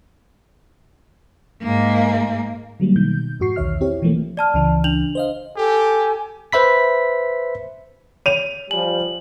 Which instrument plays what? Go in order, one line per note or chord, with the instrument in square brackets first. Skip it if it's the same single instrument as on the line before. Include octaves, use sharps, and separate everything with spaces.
[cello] G#2 A#3
[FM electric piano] D3 F#3 G3 A#3
B2 D#3 G6
F2 G#2 F#4 C#6 C7
B1 E2 D#3 C#5 E5 F6
C4 E4 G4 C#5
B2 E3 F3 A3 A#3
[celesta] D5 A5 F6
[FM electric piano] C#2 C#3 E3
[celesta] D4 F7 F#7
[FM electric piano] C5 D#5 F5
[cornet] G4 [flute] A4 [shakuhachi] G#5
[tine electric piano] B4 C5 E5 B5 B6
[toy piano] C#5 [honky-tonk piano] D#7 F7
[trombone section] F3 G3 [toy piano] G#5 [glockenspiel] F#7